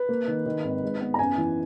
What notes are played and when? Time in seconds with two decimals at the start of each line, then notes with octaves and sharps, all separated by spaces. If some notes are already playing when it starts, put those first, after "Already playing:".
Already playing: B4
0.09 A#3
0.28 D#3
0.46 D#3
0.64 G#1
0.82 G#2
1.01 B3
1.14 A#5
1.19 F#2 G#5
1.38 E3